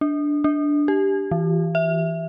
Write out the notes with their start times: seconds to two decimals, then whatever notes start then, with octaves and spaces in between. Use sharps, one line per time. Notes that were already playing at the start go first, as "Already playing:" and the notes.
0.01 D4
0.44 D4
0.88 G4
1.31 E3
1.75 E5